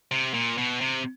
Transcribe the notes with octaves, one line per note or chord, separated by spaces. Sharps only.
C3
A#2
B2
C3